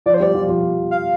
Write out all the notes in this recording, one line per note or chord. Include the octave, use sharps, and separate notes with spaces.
F3 F4 D5
C5
G3 G4 D5
F3 F4
F3 F4
F5